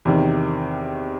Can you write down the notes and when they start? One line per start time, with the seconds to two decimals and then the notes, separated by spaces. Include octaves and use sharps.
0.05 E2 C3 D#3